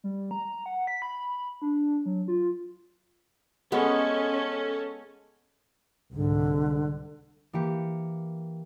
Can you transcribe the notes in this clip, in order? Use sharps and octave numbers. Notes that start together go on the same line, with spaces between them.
G3
A#5
F#5
B6
B5
D4
F#3
F4
G#3 B3 C#4 A4
C2 G#2 D3
E3 A#3 G4 C#7